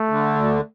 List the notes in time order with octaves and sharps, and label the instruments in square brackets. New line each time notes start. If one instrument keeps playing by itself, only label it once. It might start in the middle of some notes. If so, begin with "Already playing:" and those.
Already playing: [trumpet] A3
[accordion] D3
D2